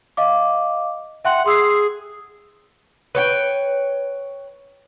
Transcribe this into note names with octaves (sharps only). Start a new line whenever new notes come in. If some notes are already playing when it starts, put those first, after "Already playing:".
D#5 F5 D6
E5 F#5 G5 C6
G#4 C6 E6 C7
B4 C#5 G5